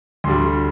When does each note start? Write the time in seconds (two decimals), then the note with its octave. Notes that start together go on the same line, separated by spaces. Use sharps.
0.24 D2 D3 G3 C6